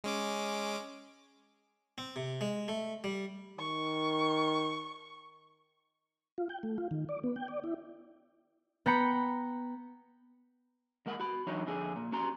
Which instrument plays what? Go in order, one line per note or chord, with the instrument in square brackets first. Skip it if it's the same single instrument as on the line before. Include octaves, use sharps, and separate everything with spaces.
[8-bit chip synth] G#3 C#4 D6
[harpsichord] C4
C3
G#3
A3
G3
[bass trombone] D#3 [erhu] C#6
[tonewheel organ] F4
G5
A3
F4
D#3
D5
B3
G5
D5
E4
[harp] B3 G5 A#5 B5 C#7
[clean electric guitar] D#2 G#3 A#4 F#5
F#4 B5
E3 F#3 D4 D#4 C#5
F2 D3 G#4
A#2
C#4 F#4 A#5 C6